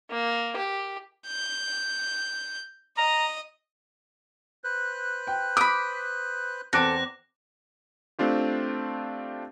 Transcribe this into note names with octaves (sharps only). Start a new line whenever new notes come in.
A#3
G4
G6
D#5 A#5
B4 C5 F#6
G5
B5 D6 D#6 B6
E2 C4 A4 D6 F#6 A#6 D7
A3 C4 D4 F4 G4